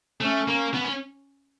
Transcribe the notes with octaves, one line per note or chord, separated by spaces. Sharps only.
A3 C#4
A#3
B3
C#4